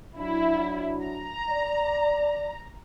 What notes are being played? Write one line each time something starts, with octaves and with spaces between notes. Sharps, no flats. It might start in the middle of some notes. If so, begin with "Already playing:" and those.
F#3 D4 E4
A#5
D5